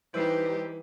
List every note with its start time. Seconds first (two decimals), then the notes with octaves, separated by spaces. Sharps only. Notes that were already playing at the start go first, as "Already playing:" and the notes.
0.14 E3 G3 D#4 G4 B4 C5 E6 C7